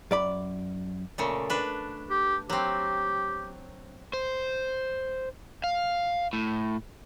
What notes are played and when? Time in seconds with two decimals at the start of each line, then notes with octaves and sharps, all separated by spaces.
0.11 F#2 D5 B5
1.18 A#2 C#3 A3
1.50 D4 B4
2.10 G4
2.50 F#3 C4 G4
4.13 C5
5.64 F5
6.33 A2